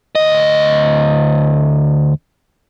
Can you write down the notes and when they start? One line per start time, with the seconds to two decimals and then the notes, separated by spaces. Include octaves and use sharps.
0.15 D2 D#5